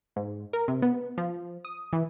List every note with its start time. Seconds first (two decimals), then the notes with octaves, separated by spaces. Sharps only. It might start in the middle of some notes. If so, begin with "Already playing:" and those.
0.16 G#2
0.53 A#4
0.68 C3
0.82 B3
1.18 F3
1.65 D#6
1.93 E3